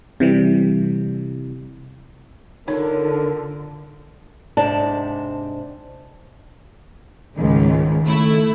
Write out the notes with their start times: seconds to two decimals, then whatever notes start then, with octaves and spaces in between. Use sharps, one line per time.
0.20 C3 E3 G3
2.68 D3 D#4 F4 A4 A#4 C#5
4.57 G#2 C3 D4 D5 A5
7.36 C#2 G#2 D#3
8.05 A3 E4